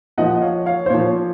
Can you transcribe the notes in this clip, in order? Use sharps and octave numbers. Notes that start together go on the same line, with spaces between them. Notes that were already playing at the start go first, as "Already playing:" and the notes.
A#2 F3 D#5 F#5
C#5 F5
C#5 F5
C5
A#2 F3 C#5